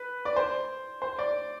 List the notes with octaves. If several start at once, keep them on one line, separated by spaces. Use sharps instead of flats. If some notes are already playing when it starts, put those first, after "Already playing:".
Already playing: B4
D5
C5
C5
D5